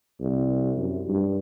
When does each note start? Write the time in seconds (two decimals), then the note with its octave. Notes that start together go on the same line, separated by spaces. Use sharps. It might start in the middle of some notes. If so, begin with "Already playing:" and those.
0.20 C2
0.77 F#2
1.09 G2